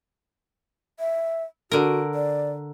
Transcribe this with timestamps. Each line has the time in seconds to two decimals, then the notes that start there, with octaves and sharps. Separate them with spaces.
1.00 E5
1.72 D3 F#4 A#4
2.15 D5